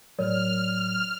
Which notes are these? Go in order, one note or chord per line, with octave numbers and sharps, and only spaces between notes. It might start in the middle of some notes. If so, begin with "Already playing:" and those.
A2 F#3 A#4 C#5 D5 F6